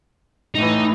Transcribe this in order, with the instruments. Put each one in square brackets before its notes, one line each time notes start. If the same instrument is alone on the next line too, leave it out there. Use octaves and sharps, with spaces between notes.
[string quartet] A2 E3 [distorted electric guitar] D#4